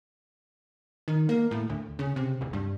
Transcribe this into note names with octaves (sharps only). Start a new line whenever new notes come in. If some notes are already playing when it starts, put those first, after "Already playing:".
D#3
A#3
A2
D2
C#3
C3
D1
G2